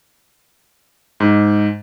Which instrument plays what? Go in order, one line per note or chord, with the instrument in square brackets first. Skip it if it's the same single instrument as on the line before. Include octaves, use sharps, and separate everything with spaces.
[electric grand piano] G#2